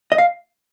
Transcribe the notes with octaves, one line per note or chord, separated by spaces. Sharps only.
D#5
F5